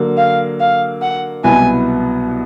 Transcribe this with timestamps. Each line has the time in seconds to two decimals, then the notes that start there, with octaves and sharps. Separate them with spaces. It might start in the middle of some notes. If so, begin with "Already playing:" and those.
Already playing: D3 F#3 A#3
0.17 F5
0.60 F5
1.02 F#5
1.44 C2 B2 F#3 B3 E4 G#5